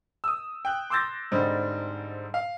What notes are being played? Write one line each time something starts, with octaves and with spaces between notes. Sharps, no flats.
D#6 E6
G5 F#6
C6 D6 E6 G6 A6 A#6
G#2 D3 G3 C4 D#4
F5